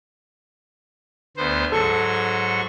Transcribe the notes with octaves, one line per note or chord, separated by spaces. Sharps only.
D2 B3 C5
G#2 F#3 A4 C#6